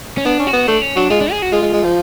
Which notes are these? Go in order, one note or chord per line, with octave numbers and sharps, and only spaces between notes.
C#4
B3 D4
C#4
F#4
B3
A3 D4
C#4
F#3 D4
G#3 F4
D4
G#4
F#4
G#3 F4
G#3
G#3
F3